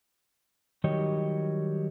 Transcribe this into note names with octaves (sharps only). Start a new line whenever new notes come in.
D#3 F#3 G3 G4 C#5 D#5